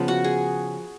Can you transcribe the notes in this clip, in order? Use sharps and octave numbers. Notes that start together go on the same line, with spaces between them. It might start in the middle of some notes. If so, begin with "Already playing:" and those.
Already playing: C#3 F3 B3
F#4
G#4